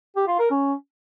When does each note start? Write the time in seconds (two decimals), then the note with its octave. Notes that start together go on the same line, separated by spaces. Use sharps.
0.16 G4
0.27 F4
0.39 A#4
0.50 C#4